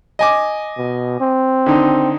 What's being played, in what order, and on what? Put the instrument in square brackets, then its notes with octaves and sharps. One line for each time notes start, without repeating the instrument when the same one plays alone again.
[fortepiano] D#5 G#5 D6
[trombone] B2
C4
[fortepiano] D3 D#3 D#4